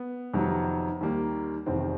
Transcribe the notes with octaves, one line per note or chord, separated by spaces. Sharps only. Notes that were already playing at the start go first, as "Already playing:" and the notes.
Already playing: B3
F2 C3 D#3 F#3
D#2 D#3 G3 A#3
F1 E2 C3 D#3 C4